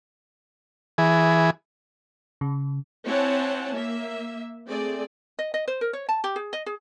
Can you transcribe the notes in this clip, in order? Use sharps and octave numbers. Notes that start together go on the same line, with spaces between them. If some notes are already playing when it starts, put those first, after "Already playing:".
E3 G#4
C#3
C4 E4 C#5 F#5 G#5 A5
A#3 E5
A3 C4 G#4 D5
D#5
D#5
C5
A#4
C#5
A5
G4
G#4
D#5
G#4